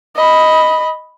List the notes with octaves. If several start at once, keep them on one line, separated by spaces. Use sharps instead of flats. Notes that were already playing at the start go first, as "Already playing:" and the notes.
D#5 B5